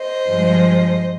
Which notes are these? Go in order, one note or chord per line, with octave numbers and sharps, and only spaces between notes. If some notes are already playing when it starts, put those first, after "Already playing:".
Already playing: C5 D#5
G2 F3 G#3